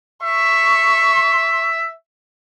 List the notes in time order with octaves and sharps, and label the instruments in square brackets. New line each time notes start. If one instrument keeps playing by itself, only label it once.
[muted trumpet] E5 [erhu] C#6